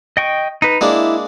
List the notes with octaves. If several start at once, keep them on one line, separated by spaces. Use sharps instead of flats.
D#5 G5 C#6
D#4 B4
G#3 A#3 D4 E4